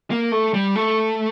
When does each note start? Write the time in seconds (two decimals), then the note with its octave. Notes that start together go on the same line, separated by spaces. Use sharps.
0.10 A#3
0.32 A3
0.54 G3
0.76 A3